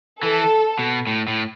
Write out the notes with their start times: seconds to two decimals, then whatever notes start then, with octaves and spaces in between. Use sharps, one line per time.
0.23 E3 A4
0.79 B2
1.07 A2
1.28 A2